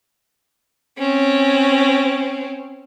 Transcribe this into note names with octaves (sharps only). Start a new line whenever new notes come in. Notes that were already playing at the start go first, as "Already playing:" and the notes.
C4 C#4